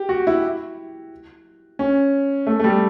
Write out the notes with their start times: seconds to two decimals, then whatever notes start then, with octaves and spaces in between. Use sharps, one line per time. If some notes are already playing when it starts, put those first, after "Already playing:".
Already playing: G4
0.09 F#4
0.27 E4
1.79 C#4
2.47 A3
2.59 A3
2.64 G3